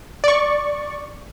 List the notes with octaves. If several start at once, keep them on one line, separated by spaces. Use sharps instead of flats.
D5 C#6